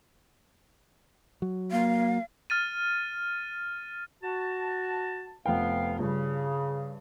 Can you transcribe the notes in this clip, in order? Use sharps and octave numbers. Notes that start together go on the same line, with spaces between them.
F#3
A#3 F5
F6 A6 D#7
F#4 A5
F1 B3 F5 G5
G2 C#3 F4